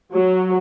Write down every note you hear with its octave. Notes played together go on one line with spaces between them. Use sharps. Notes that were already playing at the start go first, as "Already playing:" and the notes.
F#3